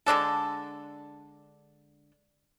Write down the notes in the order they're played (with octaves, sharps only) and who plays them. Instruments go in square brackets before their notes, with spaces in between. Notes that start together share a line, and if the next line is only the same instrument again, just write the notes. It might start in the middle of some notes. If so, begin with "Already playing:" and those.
[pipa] D3 G#3 D4 A4